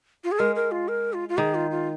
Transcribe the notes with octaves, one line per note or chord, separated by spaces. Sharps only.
F4
G#4
G#3 A#4
A#4
F4
A#4
F4
F4
D#3 G#4
F4
F4